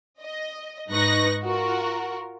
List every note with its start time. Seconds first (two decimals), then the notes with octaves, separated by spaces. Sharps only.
0.21 D#5
0.90 G#2 D#4 B4 C#6 F#6 A#6
1.41 F4 F#4 A#4